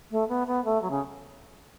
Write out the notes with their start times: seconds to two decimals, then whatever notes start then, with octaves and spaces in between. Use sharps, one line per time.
0.11 A3
0.28 B3
0.47 B3
0.65 A3
0.82 F#3
0.90 C#3